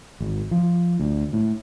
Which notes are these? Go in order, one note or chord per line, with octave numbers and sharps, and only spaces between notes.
G#1
F3
D2
A2